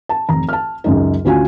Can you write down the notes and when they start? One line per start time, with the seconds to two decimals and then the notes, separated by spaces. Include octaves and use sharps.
0.09 A5
0.29 F1 A#5
0.49 A5 F6
0.84 C#2 F#2 D#4
1.25 D2 C#4 F4 F#4 G#5